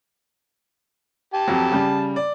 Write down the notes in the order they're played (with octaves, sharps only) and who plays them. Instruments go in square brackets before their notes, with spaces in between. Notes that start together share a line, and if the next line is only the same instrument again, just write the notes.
[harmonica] G4 A5
[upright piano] F2 F#3
C#3 G3
D5